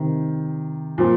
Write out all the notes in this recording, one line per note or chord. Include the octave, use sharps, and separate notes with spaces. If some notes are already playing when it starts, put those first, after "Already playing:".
Already playing: C3 D#3
A#2 F3